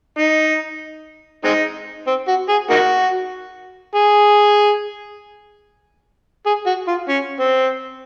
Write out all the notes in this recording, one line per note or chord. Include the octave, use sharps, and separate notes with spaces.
D#4
G#3 C4 D#4
C4
F#4
G#4
A#3 D#4 F#4
G#4
G#4
F#4
F4
C#4
C4